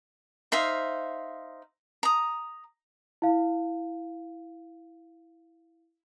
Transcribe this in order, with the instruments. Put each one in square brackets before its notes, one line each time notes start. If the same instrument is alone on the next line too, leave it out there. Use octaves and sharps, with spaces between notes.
[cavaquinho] D#4 C5 E5 F5
A#5 D#6
[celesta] E4 F5